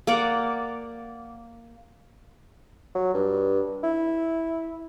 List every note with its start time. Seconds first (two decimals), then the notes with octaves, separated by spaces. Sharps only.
0.07 A#3 A#4 D5 F#5
2.95 F#3
3.14 G2
3.83 E4